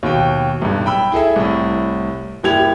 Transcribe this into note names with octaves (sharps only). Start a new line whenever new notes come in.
D#2 B2 G5
B1 G2
G5 B5 E6
E4 G#4 A4 E5
C2 A2
F#1 G3 E4 G4 G#6 F7